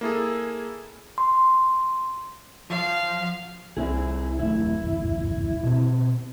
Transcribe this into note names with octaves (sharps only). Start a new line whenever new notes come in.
A#3 E4 G#4 A4
C6
F3 F5
C2 C4 E4 G#4
D#1 A3 E4
D1 G#1
B2 C4